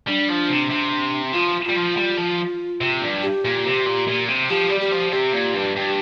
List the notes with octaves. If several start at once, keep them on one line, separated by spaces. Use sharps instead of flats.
G3 D4
F3
C3
C3
F3 F4
G3 F4
F3
G3
F3
C3
G2
G4
A#2
C3
A#2
A#2
C3
F3 G4
G3
G4
F3
C3 G4
A#2
G2
G2